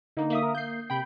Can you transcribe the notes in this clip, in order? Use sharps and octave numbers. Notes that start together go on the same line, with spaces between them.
D3 A#3 D#4
A#3 E5 D#6
A#4
A#3 G6 C7
C3 G5 B5 G6